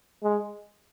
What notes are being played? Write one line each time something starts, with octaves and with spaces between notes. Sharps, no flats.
G#3